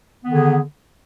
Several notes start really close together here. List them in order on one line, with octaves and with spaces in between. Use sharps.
B3 D#3 D3 G#4